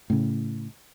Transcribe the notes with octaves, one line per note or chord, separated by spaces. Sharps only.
A2 C#3